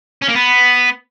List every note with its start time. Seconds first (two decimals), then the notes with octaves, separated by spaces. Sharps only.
0.22 C#4
0.28 A#3
0.35 B3